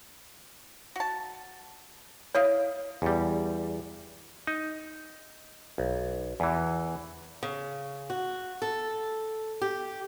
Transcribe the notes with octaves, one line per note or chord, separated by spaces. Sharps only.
F#4 A5
E4 C#5 D#5 F5
E2 G3
D#4
B1
E2 E3
C#3
F#4
A4
G4